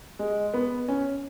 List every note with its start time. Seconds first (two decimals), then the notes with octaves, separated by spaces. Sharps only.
0.19 G#3
0.54 B3
0.88 C#4